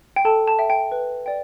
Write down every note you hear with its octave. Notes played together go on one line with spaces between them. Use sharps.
G5
A4 A5
A5
E5 G5
G5
B4
D5 G5